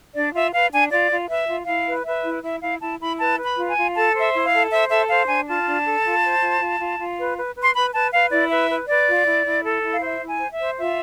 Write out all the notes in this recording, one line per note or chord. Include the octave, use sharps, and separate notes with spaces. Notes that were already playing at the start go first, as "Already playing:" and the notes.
D4 D5
F4 E5
B4 F5
D4 G#5
F4 D5
F4
B4 E5
F4
E4 F5
B4
B4 E5
E4
E4 E5
E4 F5
E4 A5
E4 B5
B4 A5
B4
B5
F4
G#5
F4
A4 A5
C5
E5
E4
F5
A4
C5 E5
A4 E5
C5 F5
D4 G#5
F4 A5
D4
A4
F4
C5
F4
F4
F4
F4
B4
B4
B4
C6
B4 B5
B4 A5
B4 F5
E4 D5
B4 E5
B4
B4 D5
F4
E4
E4
A4
E4
F5
C5 E5
E4
G#5
C5
E5
C5
F4 E5